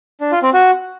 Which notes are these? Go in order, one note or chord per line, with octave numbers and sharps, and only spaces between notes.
D4
F4
C4
F#4